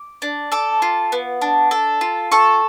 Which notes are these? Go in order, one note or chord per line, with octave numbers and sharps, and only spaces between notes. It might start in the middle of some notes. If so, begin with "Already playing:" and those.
Already playing: D6
D4
A4 D6
F4
B3
D4
A4
F4
A4 C#6